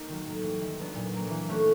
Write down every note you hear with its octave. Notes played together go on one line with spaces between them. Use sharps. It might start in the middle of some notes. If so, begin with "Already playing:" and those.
Already playing: A#3 D#4
D#3 F#3
A2
E3 G3
D#3
F#3 B3 D4
A#2
F#3 A#3
E3
A3 C#4 F#4